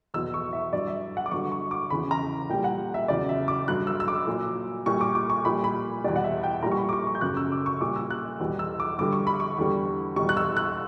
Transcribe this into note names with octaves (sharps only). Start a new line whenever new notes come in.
E2 B2 F#3 E6
C#6
E5
G2 F#3 D5
E5
F#5
D6
G2 D3 F#3 C#6
C#6
D6
E2 C#3 E3 B5
A#5
A#2 G3 G5
F#5
E5
E2 C#3 F#3 D5
E5
D6
G2 F#3 F#6
E6
E6
D6
A#2 F#3
A#2 G3 C#6
D6
D6
C#6
A#2 G3 B5
B5
E2 B2 G3 D5
F#5
E5
G5
A#2 G3 A#5
C#6
B5
D6
C#6
C#6
G6
F#2 C#3 F#3 F#6
E6
D6
C#6
A#2 G3 D6
E6
F#6
E2 B2 G3
E6
D6
G2 D3 G3 D6
C#6
B5
C#6
E2 D3 G3
E2 B2 G3 C#6
F#6
E6
F#6